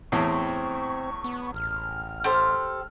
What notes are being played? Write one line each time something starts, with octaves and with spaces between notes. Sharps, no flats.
E2 A2 C4 C#6
B3
A1 F6
G4 A4 C5